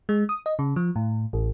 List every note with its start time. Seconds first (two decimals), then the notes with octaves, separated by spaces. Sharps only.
0.09 G#3
0.29 D#6
0.46 D#5
0.59 C#3
0.76 F3
0.96 A2
1.33 A1